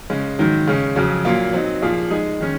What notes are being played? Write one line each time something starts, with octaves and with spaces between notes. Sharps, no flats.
C#3 G#3 C#4
G#2 D#3 F#3
C#3 G#3 C#4
F2 C#3 F#3
A#2 F#3 A#3 F4
F#3 C4 D#4
A#2 F3 A#3 F4 G#4
G#3 D#4 G#4
D#3 G#3 C#4